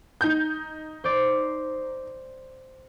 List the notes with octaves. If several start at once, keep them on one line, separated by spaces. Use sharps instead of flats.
D#4 G6
C5 D5